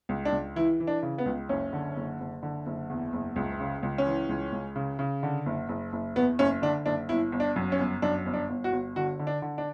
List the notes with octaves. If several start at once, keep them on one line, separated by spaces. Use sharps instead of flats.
C#2
D4
C#2
E3 E4
E3
D4
C#3
B3
C#2
F#1 C#4
D3
F#1
F#1
D3
F#1
E2
F#1
C#2
C#3
C#2
C#4
E3
C#2
C#2
C#3
C#3
D3
F#1
F#1
F#1
E2 B3
F#1 C#4
D3 D4
F#1 D4
G1 E4
G1
D4
F#2
C#4
G1
F#2 D4
G1
D4
G1
F#4
G1
D3 F#4
D3
D4
D3
D4